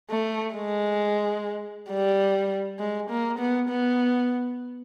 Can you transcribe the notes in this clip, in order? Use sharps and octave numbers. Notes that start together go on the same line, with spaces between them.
A3
G#3
G3
G#3
A#3
B3
B3